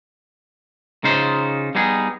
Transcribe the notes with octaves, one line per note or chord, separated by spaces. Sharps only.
C#3 D#4 F4 C5
G3 B3 D#4 G#4